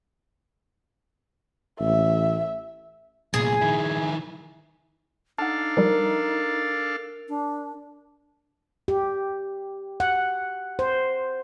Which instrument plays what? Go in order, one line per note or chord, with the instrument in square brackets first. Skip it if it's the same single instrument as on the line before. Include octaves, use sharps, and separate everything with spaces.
[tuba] A1 [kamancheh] E5
[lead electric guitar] C2 A#2 [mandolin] G#4
[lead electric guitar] D#3 E4
[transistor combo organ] D4 A4 F5 [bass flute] D#4 [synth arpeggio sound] F#5 A5
[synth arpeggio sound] F3 G3 [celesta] A#4
[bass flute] D4
[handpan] G4
F#5
C5